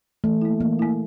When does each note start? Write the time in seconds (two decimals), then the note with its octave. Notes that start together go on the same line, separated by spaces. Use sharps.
0.24 E3 A3
0.42 A#3 E4
0.60 E3 A#3
0.79 A#3 E4